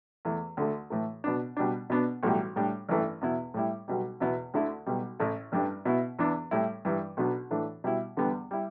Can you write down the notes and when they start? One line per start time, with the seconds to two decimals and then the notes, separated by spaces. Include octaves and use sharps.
0.25 E2 E3 A3 E4
0.57 D2 D3 A3
0.90 A2 E3 A3
1.24 B2 B3 D4
1.57 B2 G3 D4
1.90 B2 B3 D4
2.23 B1 A2 E3 G3
2.56 A2 G3 D4
2.89 A1 G2 E3 A3
3.21 E2 B2 B3 E4
3.54 A2 G3 E4
3.88 B1 B2 G3
4.20 E2 B2 B3 E4
4.54 D2 D3 A3 E4
4.86 B1 B2 G3
5.19 A1 A2 A3 E4
5.52 A1 G2 G3 D4
5.85 B2 B3 E4
6.19 E2 E3 B3 D4
6.51 A2 G3 E4
6.85 G2 E3 G3
7.17 B1 B2 B3 D4
7.51 A2 E3 A3 D4
7.84 B2 G3 E4
8.17 E2 D3 G3 B3 D4
8.51 G3 E4